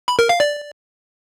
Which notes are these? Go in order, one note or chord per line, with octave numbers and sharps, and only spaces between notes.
B5
A#4
F5
D5